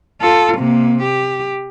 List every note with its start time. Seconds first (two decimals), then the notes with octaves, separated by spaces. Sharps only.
0.21 F4 A4
0.58 C3 A#3
1.02 G4